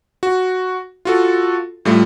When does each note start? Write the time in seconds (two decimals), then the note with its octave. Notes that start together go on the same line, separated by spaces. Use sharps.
0.23 F#4
1.05 F4 F#4 A4
1.85 A2 G3 A3 F4